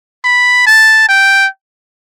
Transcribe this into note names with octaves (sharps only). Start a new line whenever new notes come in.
B5
A5
G5